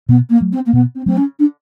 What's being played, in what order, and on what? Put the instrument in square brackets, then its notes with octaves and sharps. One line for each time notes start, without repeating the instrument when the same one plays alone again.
[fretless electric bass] B2 [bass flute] B3
[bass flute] A#3
[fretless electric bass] F#3 A3
[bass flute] C4
A#3
[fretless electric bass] B2 [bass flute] B3
[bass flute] C4
[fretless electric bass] F#3 A3 [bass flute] C4
[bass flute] C#4
D4